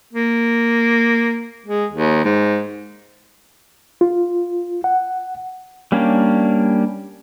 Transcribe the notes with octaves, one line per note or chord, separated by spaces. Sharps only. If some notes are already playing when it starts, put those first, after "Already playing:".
A#3
G#3
D#2
G#2
F4
F#5
G3 A#3 C#4 D4